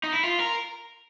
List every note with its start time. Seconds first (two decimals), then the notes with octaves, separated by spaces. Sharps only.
0.03 D#4
0.13 E4
0.23 F4
0.39 A#4